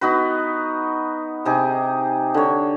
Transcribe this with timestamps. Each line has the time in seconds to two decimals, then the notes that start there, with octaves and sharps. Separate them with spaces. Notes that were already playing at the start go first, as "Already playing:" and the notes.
0.01 B3 D#4 F#4 B4
1.45 C3 D#4 G4 G#4
2.34 D3 C#5